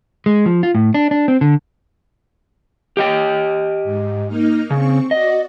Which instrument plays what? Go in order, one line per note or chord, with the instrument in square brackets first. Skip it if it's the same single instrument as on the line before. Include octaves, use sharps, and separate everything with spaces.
[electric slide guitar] G#3
F3
F4
A2
D4
D4
C4
D3
G4 D#5 G5
[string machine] G#2
A#3 D#4 F6
[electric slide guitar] C#3 [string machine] C4 C#6
[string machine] F#4 D5 [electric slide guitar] D#5